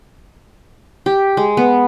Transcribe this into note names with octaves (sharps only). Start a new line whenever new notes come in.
G4
G#3
B3